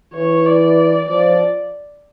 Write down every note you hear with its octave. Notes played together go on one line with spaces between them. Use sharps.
E3 C#5
D5
F3 D5